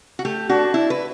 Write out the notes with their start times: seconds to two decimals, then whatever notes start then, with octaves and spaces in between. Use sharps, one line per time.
0.19 F#4
0.25 A3 G4
0.49 D4 F#4
0.74 D4 E4
0.90 B4